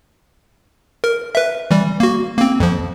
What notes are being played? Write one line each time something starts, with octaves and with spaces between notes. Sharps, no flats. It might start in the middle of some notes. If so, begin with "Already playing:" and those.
A#4
B4 E5
E3 G3
A#3 F#4
A#3 C4
F2 F3